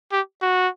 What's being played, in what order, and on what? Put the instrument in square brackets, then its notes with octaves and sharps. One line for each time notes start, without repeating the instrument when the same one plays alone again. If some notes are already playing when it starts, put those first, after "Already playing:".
[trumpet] G4
F#4